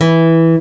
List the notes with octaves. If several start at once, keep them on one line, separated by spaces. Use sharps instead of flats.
E3